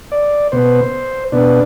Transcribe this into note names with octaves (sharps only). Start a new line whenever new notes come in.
D5
B2 B3 C5
B2 B3 D4